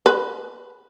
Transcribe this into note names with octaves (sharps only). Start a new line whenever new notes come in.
B4